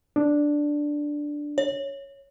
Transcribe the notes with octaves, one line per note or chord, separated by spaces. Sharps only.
D4
C#5